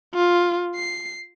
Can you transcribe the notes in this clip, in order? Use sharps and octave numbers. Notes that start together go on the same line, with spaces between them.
F4
C7